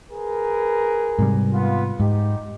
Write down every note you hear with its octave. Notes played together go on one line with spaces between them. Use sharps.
G#4 A#4 B4
G#2 C3 G3
B3 F4
G#2 D#4 G4